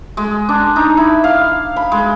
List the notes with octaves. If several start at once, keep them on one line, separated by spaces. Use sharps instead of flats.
G#3
D4
D#4
E4
F5
B5
G#3